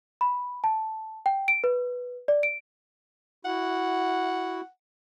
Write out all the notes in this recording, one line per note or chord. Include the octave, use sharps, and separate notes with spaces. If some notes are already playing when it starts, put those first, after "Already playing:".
B5
A5
G5
D7
B4
D5
D7
E4 F#4 F#5